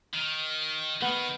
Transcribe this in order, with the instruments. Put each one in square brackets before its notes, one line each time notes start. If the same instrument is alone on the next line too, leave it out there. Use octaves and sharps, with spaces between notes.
[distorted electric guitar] D#3
[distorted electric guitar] D#3 [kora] B3